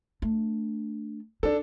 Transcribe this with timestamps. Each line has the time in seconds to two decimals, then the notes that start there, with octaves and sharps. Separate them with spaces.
0.22 A3 D4
1.43 D4 D#4 A4